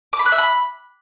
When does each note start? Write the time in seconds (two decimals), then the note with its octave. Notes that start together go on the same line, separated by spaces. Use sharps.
0.13 D6
0.19 B5
0.26 F#6
0.32 E5
0.38 B5